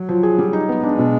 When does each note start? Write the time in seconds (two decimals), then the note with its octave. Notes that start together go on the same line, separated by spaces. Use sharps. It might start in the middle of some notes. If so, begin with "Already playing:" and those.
Already playing: F#3
0.09 F3
0.23 G#4
0.39 G3
0.53 D#4
0.69 B3
0.83 G#3 D4
0.98 B2